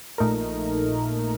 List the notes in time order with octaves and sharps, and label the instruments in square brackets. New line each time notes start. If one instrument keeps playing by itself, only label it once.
[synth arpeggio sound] A#1 A#2 A3 D#4 A#4